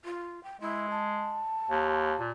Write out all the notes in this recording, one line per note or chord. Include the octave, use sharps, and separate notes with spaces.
F4
G5
G#3 E4
A5
D#2
A#2